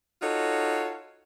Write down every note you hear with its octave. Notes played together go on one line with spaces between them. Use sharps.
D#4 F4 F#4 A4 C#5